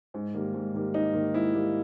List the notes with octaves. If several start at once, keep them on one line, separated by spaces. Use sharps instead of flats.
G#2
D#3 G3 A#3
G#2
D#3 G3 A#3
G#2 D#4
D#3 G3 A#3
G#2 E4
D#3 G3 A#3